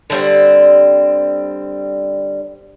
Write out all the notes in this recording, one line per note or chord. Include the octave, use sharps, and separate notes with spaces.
D3 G3 C4